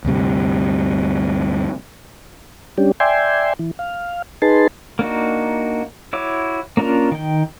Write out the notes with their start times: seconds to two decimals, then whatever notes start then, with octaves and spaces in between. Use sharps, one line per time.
0.05 D2 G2 C3 G3
2.78 G3 C#4 D4 G4
3.00 D5 E5 G5 G#5 C6
3.59 E3
3.79 F5
4.42 D#4 G#4 B4 A5 C6
4.99 A#3 D4 D#4 F#4
6.13 E4 F#4 C#5 D6
6.77 A#3 C#4 D4 F4 A#4
7.11 D#3 G5